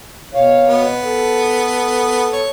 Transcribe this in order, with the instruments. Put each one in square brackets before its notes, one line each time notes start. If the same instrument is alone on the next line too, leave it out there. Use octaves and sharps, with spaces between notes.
[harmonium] B2 C#5 F5
[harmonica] B3
[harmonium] A4
[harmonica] C#5